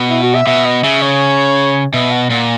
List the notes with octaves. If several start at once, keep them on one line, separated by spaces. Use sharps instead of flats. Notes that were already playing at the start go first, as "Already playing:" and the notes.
Already playing: B2
E4
F#4
E5
B2 E5
D#5
C#3 E5
C#5
B2 E5
F#5
A#2 F#5